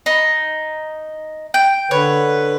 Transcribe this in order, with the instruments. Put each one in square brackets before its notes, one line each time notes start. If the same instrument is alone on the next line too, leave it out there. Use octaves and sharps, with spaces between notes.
[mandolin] D#4
G5
[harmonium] D3 B4 [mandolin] C#5